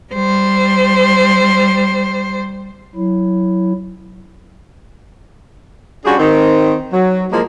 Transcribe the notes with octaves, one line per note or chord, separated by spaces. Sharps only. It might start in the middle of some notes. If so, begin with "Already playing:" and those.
G3 C5
F#3 E4
G3 C#4 D4 F4 F#4 G#4
D#3 C4
F#3
A2 F3 G#3 A#3